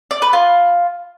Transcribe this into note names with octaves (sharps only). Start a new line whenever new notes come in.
D5
B4
F4